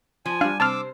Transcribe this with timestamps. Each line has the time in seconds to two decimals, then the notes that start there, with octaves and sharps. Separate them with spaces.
0.26 F3 G#5
0.41 G3 D4 F5
0.60 C3 C5 A5 D6 E6 F6